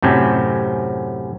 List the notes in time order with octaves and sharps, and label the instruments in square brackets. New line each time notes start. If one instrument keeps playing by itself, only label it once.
[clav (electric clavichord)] F#2 A2 C3 C4 C#4